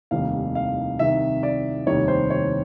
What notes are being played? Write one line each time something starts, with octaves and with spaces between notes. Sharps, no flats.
F1 D#2 D#3 G3 F5
F5
C2 C3 D#3 E5
D5
F1 D#2 D#3 G3 C#5
C5
C#5